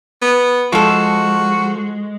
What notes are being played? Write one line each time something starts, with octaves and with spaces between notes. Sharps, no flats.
B3
F3 G#3 F#4 A4